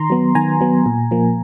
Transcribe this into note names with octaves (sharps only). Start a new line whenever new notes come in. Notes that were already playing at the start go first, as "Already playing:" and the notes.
Already playing: D#3 A#5 C6
F#3 B3
D#3 G#5 A#5
F#3 B3
A#2
F3 A#3